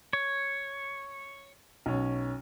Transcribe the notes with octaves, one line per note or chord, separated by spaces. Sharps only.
C#5
B1 C#4